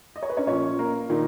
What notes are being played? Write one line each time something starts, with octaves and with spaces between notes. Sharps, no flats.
D#5
C#5
B4
C#4 C#5
A#2 F3 C#4 C#5
A#3 A#4
A#2 D#3 D#4